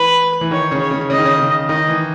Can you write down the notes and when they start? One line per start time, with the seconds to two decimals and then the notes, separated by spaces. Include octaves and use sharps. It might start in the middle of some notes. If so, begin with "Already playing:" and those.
Already playing: E3 B4
0.41 E3
0.51 D#3 C#5
0.71 C#3
0.81 C#5
0.91 C#3
1.10 C#3 D#5
1.18 D#3
1.26 C#3
1.39 C#3
1.69 D#3 D#5
1.88 E3